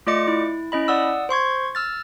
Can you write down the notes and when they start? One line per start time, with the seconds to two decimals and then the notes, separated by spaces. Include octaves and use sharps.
0.07 A3 F4 D5 D#5 D6 C#7
0.27 E4
0.72 C#4 E4 D#5 B5
0.88 D5 F#5 D#6 E6
1.29 C5 C6 C#6 G#6
1.75 E6 F6 A6